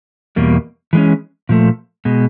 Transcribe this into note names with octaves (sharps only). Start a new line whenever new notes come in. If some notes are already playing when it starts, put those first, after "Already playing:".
E2 B2 G3 A#3
E3 G#3 C#4
A#2 F3 A3
B2 G#3